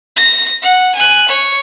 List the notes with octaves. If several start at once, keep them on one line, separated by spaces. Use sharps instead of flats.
A#6
F#5
G#5 F#6
C#5